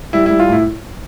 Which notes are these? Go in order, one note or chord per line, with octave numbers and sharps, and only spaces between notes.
G3 E4
G3 E4
F4
A2 E4